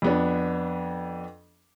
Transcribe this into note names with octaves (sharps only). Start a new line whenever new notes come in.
F2 B3 D4